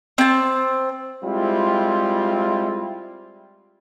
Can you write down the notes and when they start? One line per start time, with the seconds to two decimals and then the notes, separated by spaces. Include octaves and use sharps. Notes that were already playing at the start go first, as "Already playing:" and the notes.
0.18 C4 A5
1.24 G3 G#3 C4 E4 F4